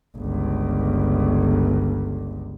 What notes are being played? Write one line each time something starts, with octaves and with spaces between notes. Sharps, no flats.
G1 C#2